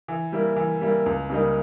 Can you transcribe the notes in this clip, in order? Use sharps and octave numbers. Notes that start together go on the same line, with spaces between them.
E3
G3 A#3 E4
E3
G3 A#3 E4
C#2
C#3 G3 A#3 D#4